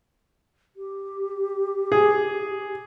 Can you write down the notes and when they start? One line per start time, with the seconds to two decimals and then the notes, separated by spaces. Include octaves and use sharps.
0.76 G4
1.92 G#4